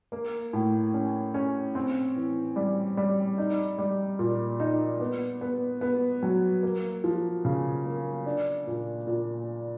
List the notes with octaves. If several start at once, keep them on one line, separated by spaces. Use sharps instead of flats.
A#3
A2
C#4
C#4
C4
E3
G3
G3
D#4
G3
A#2
D#4
B3
B3
B3
F#3
A#3
F3
C#3
A#3
D4
A#2
A#2